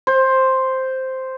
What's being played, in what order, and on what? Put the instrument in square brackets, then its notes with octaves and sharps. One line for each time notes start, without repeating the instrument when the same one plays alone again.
[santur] C5